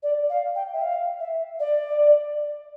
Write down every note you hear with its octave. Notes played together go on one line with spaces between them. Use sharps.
D5
F5
G5
E5
F5
E5
D5